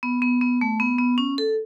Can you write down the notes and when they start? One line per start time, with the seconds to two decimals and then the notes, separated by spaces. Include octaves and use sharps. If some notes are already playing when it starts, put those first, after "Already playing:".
0.03 B3
0.22 B3
0.41 B3
0.61 A3
0.80 B3
0.99 B3
1.18 C#4
1.38 A4